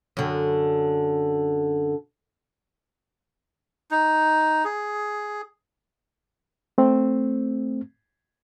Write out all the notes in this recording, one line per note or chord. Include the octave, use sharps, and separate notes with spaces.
F#2 D3
D#4
G#4
A3 C4